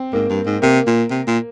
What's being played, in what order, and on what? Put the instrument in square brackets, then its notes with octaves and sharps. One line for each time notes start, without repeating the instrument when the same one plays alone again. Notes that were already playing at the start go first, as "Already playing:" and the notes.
Already playing: [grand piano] C4
[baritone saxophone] G#2 [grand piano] A#3
[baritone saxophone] G2
G#2
[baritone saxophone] C3 [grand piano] A#3
[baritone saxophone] A#2
C3
A#2